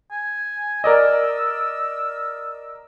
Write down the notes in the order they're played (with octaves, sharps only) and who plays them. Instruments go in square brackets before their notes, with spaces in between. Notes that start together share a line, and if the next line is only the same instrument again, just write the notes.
[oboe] G#5
[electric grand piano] A#4 D5 D#5 [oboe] E6